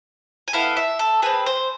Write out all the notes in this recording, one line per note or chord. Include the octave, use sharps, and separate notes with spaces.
G#5
B3 E4 A4 F5
E5
A4
C4 G#4 B4
C5